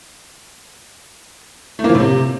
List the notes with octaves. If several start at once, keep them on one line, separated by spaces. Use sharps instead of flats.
A3
A#3
F3
A2
C3